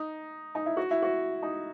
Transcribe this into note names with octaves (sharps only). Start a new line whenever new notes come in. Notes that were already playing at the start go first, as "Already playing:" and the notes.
Already playing: D#4
D#4
E4
F#4
E4
F#4
D#4